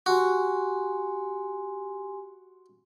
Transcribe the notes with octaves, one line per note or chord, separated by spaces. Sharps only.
F#4 G4 G#5 C6